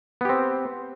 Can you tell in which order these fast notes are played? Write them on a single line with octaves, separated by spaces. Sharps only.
B3 G4 C4